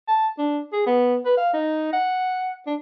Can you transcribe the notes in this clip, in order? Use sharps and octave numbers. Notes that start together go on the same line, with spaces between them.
A5
D4
G#4
B3
B4
F5
D#4
F#5
D4